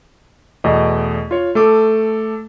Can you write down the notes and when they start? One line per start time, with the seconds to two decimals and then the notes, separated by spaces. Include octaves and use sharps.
0.64 E2 B2 A3 D5 D#5
1.31 F4 C#5
1.55 A3 A4 D6